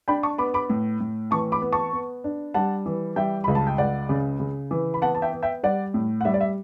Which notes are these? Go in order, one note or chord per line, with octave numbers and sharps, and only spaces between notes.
D4 G5 B5
A5 C#6
B3 B5 D6
B5 D6
A2
A2
E3 A5 C#6
B5 D6
B3
A5 C#6
B3
D4
G3 F#5 A5
E3
G3 E5 G5
C#2 B5
A5
G5
C#2 D5 F#5
C#3
C#3
E3
B5
B3 F#5 A5
A5
E5 G5
B3
E5 G5
G3 D5 F#5
A2
F#5
G3 E5
D5
E5